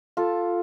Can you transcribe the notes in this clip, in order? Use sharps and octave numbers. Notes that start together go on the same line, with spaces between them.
F4 A4